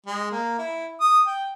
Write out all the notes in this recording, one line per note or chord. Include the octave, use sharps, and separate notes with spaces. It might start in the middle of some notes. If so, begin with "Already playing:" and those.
G#3
A#3
E4
D#6
G5